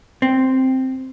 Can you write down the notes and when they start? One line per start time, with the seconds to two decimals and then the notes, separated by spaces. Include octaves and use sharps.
0.22 C4